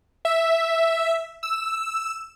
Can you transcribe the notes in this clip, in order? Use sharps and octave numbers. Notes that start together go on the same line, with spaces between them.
E5
E6